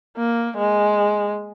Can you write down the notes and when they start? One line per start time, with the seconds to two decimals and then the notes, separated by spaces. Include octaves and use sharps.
0.17 A#3
0.57 G#3